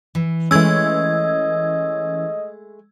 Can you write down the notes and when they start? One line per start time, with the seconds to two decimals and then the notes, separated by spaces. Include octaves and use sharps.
0.15 E3
0.51 E3 G#3 A3 C#4 D#5 E6 G#6